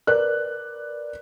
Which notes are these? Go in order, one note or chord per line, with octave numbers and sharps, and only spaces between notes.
A#4 B4 D5 F#6